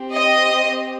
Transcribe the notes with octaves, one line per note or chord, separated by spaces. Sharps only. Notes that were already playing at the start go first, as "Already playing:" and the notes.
Already playing: C4 G4
D#5